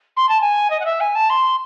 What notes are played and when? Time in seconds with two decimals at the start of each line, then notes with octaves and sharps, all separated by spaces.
0.16 C6
0.29 A5
0.41 G#5
0.70 D#5
0.80 F#5
0.85 E5
1.00 G#5
1.15 A5
1.30 C6